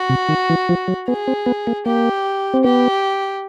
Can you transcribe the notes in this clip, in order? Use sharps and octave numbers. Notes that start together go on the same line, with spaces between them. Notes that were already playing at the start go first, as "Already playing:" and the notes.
Already playing: F#4
C3
D#3
E3
F3
F#3
B3 G#4
C4
B3
A#3
A#3 G4
C4
B3 G4